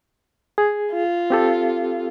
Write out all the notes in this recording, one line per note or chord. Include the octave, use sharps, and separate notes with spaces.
G#4
F4
C4 G4 A4